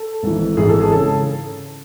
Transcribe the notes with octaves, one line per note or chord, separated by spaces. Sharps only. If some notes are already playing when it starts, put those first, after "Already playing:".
Already playing: A4
G#1 G#2 E3
G#1 G#2 E3 G#4
A4
G#4
C#3 A4